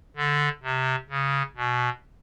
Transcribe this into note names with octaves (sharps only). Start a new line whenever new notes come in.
D3
C3
C#3
B2